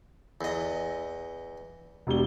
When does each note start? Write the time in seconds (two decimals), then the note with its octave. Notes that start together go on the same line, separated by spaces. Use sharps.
0.41 E2 D#5
2.07 E1 G4 G7